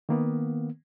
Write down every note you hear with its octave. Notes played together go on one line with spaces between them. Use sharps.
D#3 A#3 B3